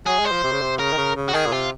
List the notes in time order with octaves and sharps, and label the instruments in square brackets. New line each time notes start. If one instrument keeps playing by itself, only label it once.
[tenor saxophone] F#3 [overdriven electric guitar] G#4
[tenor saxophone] G#3
[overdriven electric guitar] C5
[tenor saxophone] F3
C3
C#3
C3
[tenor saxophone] C#3 [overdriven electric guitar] A#4
[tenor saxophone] D#3
C#3
C#3
[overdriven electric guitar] F#4
[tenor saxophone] D#3 [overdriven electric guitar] G#4
[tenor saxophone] A#2
[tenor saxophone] C3 [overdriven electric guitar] F4